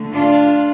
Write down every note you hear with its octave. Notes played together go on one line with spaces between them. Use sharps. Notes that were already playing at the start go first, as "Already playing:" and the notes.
Already playing: D3 A3
D4 F4